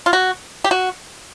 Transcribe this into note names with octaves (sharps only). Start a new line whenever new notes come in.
F4
F#4
G4
F#4